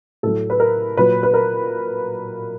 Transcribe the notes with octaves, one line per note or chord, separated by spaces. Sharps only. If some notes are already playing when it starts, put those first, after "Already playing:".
A2 F#3 A4
B4
A#4
A#2 F#3 B4
B4
A#4